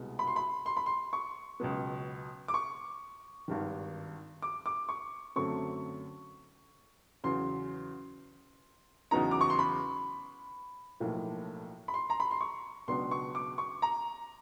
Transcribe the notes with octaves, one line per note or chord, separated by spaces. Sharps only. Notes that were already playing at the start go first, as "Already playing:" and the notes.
Already playing: C2 B2 G#3
B5
C6
B5
C6
B5
C6
C#6
C#2 B2 F#3 B3
D6
C#6
G#1 G2 D#3
D6
D6
C#6
F#2 D3 F#3 A3 C4 C#6
E2 C#3 F#3 C6
E2 C#3 F#3 B3 D#4 A#5
D6
C#6
C6
B5
B1 A2 F3 A#3
B5
C6
A#5
B5
C6
C#6
C#2 B2 F#3 B3 D4 C6
C#6
D6
C#6
A#5